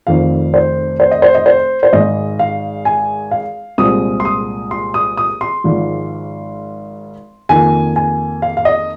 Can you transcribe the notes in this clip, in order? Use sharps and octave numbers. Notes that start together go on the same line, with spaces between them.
F1 F2 D#3 C4 F5
C5
C5
D#5
C5
D#5
C5
C5
G#1 G#2 G#3 D#5
F5
G#5
F5
C2 A#2 G#3 C4 D#6
C6
D#6
C6
D#6
D#6
C6
G#1 G#2 F3
F2 D#3 A#3 G#5
G#5
F5
F5
D#5